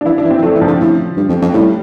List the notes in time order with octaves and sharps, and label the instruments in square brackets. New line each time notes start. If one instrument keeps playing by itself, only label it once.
[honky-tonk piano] D4
[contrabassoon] E3 [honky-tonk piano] E4
[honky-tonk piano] D4
[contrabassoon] E3
[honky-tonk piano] C4
[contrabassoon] E3
[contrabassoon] F3 [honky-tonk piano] A3
[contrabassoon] E3
[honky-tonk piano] F3
[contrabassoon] D3
A2
G2
F2
F2
[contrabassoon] A2 [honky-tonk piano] G3